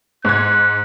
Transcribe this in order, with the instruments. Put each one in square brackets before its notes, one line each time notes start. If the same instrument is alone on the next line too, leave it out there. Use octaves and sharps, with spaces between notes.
[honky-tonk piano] G#2 G#6 [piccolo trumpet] F#6